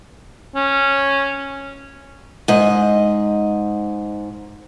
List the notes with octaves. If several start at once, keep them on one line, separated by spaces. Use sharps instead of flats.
C#4
G#2 D#5